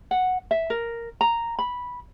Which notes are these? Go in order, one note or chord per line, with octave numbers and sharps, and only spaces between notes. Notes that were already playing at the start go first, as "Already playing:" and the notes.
F#5
E5
A#4
A#5
B5